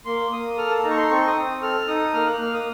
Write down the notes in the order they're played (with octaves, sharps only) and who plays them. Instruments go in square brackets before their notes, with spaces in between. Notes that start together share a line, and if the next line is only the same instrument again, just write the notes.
[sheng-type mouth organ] A#3 C6
A#3 D#6
A4 F6
A5
D#4 A#5
C#6
C6
C4 C#6
D#6
C4
A4 F6
D#4 D#6
A#3 F6
F#6
A#3 F6
D#6